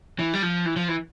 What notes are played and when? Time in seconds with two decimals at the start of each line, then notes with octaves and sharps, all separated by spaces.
0.19 E3
0.34 G3
0.43 F3
0.65 E3
0.76 F3
0.88 E3